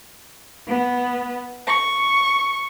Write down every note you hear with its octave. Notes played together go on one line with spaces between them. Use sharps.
B3
C#6